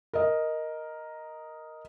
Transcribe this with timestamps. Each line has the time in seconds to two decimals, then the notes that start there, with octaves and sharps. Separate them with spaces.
0.13 A#4 D#5